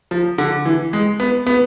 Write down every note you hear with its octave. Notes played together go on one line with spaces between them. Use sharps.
F3
D3
E3
G#3
B3
B3